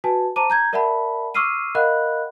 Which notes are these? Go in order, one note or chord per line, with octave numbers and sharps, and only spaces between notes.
F#4 B4 G#5 A5
C5 A5 A#5 D6 D#7
A#5 G6 G#6
A#4 D5 E5 F#5 A5 B5
C#6 D6 E6 F6 C7 D#7
A#4 D#5 F5 F#5 B5 F#6